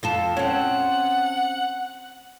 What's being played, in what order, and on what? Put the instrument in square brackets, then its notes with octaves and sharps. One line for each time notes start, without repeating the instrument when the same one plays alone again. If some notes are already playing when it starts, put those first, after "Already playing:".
[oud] F2 F4 A4
[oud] C4 C#4 [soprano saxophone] F#5